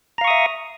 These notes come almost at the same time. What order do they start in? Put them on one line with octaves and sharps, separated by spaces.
A#5 F5 C#6 D#6 E5